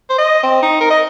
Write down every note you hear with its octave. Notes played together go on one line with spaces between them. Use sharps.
C5
D#5
C4
D#4
A#4
D#5